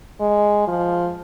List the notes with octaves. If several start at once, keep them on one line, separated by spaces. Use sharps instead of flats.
G#3
F3